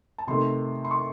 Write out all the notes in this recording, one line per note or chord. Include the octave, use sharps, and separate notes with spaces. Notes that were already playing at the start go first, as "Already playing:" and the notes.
A5
C3 D#3 A3 C6
C6
C#6